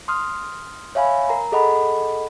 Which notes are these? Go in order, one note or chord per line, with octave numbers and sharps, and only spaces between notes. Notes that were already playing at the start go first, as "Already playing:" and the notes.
C6 D#6 F6
C#5 E5 F5 G#5 B5
A#4 A#5
G#4 A4 D#5 F#5 B5